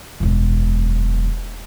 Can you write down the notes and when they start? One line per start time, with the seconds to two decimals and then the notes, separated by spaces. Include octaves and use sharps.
0.20 E1 F#2